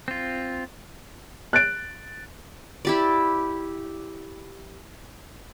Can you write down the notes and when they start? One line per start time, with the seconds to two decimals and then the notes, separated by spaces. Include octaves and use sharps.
0.08 C4 F4
1.53 F#6 A6 D7
2.85 E4 G4 D5